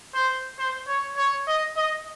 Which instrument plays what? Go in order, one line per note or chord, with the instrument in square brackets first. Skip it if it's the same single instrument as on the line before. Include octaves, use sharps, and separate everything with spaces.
[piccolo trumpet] C5
C5
C#5
C#5
D#5
D#5